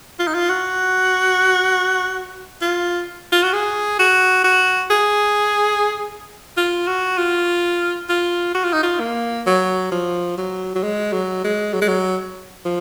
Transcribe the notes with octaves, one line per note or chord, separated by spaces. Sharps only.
F4
D#4
F4
F#4
F4
F4
F#4
G#4
F#4
F#4
G#4
F4
F#4
F4
F4
F#4
F4
D#4
F4
A#3
F#3
F3
F#3
F#3
G#3
F#3
G#3
F#3
G#3
F#3
F3